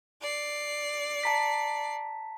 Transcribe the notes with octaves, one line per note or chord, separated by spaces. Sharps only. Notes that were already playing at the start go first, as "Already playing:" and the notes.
D5 C7
A5 A#5 B6